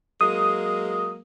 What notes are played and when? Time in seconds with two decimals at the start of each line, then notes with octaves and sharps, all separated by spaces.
0.21 F#3 G#3 A#3 D#6